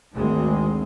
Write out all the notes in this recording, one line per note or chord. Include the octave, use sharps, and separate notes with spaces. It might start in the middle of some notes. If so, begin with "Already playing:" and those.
G#1 D2 G#3 C4